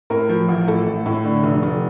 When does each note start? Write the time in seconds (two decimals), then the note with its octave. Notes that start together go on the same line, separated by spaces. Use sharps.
0.10 A2 A#4
0.29 F3
0.49 A1
0.67 A2 A4
0.86 A2
1.06 A2
1.24 D3
1.43 F1
1.63 F1